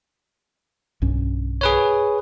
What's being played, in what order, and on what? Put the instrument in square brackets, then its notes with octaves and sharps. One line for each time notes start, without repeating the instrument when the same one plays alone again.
[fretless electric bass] B1 G2 C#4
[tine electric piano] G#4 B4 C#5